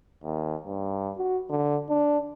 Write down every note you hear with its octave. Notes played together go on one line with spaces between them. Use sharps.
D#2
G2
F#4
D3
D4